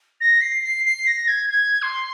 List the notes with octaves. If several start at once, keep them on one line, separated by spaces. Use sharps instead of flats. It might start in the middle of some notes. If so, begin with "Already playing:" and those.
A#6
C7
C7
C7
A#6
G#6
G#6
C6